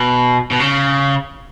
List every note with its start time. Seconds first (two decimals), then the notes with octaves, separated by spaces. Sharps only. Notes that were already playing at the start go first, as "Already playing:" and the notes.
Already playing: B2
0.51 B2
0.60 C#3